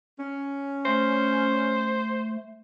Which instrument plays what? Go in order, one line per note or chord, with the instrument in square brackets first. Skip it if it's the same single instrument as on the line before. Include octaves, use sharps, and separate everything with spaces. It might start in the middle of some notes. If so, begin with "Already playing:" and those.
[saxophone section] C#4
[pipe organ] A3 [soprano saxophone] C5